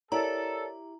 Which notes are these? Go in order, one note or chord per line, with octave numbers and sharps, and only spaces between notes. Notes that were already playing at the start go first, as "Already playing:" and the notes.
E4 G4 A4 A#4 C#5 D5 A#5